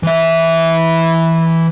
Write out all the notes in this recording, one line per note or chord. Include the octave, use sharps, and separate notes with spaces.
E3 E5